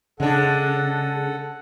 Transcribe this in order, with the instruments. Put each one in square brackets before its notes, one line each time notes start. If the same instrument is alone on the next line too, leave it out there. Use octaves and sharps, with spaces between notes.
[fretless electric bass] C#3 [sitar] G#3 D4 [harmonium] A4 F#5